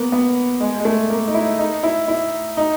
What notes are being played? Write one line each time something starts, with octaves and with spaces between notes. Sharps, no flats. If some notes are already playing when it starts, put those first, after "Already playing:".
Already playing: A#3 B3
B3
G#3
G#3
A3
A#3
D#4
E4
D#4
E4
E4
D#4